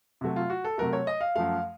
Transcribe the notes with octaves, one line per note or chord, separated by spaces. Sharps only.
C3 F#3 A3
F4
F#4
A4
C3 F#3 A3 A#4
C#5
D#5
F5
F#2 F3 A3 F5